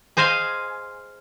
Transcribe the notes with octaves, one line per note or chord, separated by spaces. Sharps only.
G#4 C5 D#5 F5 G#5